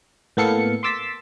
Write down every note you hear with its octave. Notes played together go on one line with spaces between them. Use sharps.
A2 A#3 B3 A4 F5 C#7
C6 D6 E6 A6 B6